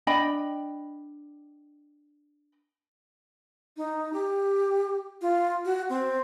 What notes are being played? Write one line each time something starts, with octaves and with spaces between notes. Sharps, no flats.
D4 D#5 G5 B5
D#4
G4
F4
F#4
C4